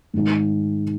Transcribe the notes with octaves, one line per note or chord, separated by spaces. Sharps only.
G#2 D#3 G#3 D#4